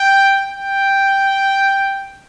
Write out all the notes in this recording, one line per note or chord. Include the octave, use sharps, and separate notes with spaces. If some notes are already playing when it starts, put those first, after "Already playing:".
Already playing: G5
G5